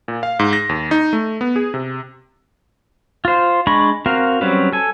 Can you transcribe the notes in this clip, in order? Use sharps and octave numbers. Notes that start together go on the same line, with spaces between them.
A#2
F5
G#2
A#6
D#2
D#4
A3
B3
G#4
C3
F4 C5
G#3 D4 D#5 B5 C#6
C4 F#4 A#4 F5
F#3 G3 C4 C#4 B4
A4 G#5